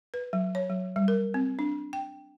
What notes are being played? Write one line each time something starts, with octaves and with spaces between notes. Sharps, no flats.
B4
F#3
C#5
F#3
G3
A#4
C4
D4
G5